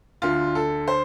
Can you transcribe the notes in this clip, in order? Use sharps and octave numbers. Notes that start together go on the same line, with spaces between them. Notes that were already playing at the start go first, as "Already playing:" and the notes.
D2 D3 F4
A4
C5